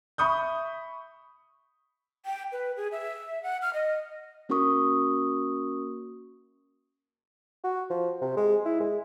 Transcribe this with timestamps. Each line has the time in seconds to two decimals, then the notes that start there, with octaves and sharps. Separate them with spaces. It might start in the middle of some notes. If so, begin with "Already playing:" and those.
0.18 E5 B5 C#6 D#6 G6
2.26 G5
2.52 B4
2.77 G#4
2.92 E5
3.43 F#5
3.62 F6
3.74 D#5
4.49 A#3 C#4 F#4 A#4 C#6 D#6
7.64 F#4
7.90 F3
8.21 C3
8.37 G#3
8.65 E4
8.80 G#3